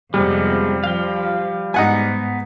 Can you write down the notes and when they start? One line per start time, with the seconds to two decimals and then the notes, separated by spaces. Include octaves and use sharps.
0.14 F2 C3 F3 G3 G#3 B3 D#4
0.84 F3 F5 G5
1.74 G#2 G#3 B3 D#4 F#5 G#5